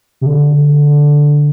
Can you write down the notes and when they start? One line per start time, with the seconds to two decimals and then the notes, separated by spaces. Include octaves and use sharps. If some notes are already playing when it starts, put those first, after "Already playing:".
0.21 C3
0.26 D3